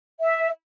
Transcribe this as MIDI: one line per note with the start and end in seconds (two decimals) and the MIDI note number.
0.21 0.49 76